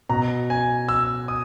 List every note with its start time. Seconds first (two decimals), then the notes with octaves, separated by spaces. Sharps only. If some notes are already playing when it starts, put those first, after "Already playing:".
0.09 B2 A#5
0.50 G#5
0.89 E6
1.28 D#6